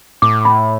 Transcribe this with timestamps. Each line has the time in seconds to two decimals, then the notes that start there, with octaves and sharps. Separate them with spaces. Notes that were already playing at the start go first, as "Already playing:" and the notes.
0.22 A2 D6
0.45 B5